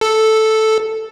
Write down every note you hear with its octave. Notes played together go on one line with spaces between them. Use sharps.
A4